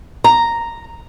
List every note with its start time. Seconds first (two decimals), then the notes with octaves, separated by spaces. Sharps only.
0.24 A#5